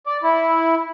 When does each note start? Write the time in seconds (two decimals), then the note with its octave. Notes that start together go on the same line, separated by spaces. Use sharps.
0.06 D5
0.23 E4